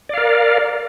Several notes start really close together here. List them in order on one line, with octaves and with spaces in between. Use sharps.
D5 F5 A#4